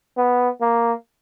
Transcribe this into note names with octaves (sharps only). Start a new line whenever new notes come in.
B3
A#3